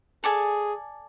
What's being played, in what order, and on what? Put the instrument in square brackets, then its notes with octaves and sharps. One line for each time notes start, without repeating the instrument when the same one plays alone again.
[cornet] G#4 [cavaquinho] A4 D5 G#5